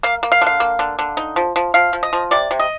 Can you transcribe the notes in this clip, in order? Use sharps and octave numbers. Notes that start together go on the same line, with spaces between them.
A#3 F5
A#3
F5
D3
F5
A#3
D3
D3
D#4
F3
F3
F3 F5
F3
D#5
F3
C3 D5
C3
D#5